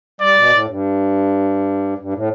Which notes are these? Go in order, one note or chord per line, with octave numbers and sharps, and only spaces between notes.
G3 D5
B2
A2
G2
G2
A2